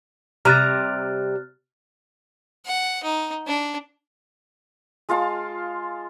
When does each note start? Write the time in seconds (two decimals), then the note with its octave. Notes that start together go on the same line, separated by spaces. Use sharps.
0.45 C3 G3 A#5 F6 F#6 A6
2.65 F#5
3.03 D#4
3.47 D4
5.09 G#3 F4 F5 A5